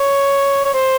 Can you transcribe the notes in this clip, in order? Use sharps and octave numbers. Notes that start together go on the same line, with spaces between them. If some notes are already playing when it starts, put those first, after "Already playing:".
Already playing: C#5
C#5
C5